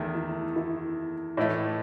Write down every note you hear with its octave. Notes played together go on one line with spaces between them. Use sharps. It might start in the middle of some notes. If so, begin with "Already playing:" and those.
Already playing: E2 D#3 A3
E4
E4
A2 E3 A3 D#5